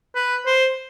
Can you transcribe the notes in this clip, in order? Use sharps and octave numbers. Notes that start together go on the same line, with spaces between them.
B4
C5